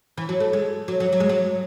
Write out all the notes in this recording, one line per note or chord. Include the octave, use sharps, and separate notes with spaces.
E3
F#3
A3
G#3
F#3
F#3
F#3
G#3
F#3